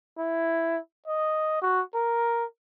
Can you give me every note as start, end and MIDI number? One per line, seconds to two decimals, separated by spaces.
0.18 0.79 64
1.07 1.59 75
1.62 1.82 66
1.94 2.45 70